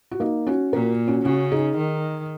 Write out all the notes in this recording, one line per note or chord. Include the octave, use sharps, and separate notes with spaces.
F#4
A#3 D#4
C#4 F#4
A#2 F#4 A#4
C#4 F#4
C#3 C#4 F#4
D#4 G#4
D#3